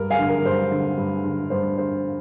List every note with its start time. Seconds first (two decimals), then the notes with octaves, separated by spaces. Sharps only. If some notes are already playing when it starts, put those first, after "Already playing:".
Already playing: G2 A#4
0.10 F5 G#5
0.19 D3
0.28 A#4
0.45 G2 C5
0.72 D3
0.97 G2
1.24 D3
1.50 G2 C5
1.77 D3 C5